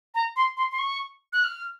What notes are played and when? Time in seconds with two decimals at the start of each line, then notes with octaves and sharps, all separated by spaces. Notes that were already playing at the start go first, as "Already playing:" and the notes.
0.15 A#5
0.36 C6
0.57 C6
0.71 C6
0.79 C#6
1.33 F#6
1.44 F6